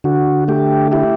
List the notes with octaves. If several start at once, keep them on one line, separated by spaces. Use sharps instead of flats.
D3 F#4
A3 G4
E4 G4